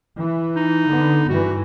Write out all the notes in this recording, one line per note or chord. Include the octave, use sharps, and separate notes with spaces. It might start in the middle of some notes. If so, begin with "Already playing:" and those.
E3
D#4
D3 B3
G2 E3 F#4